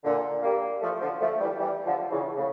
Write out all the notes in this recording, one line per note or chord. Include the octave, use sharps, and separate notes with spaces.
A#2 D3
G3 A#3
F3 A3
D3 F3
F3 A3
E3 G3
E3 G3
D3 F3
C#3 E3
A2 C#3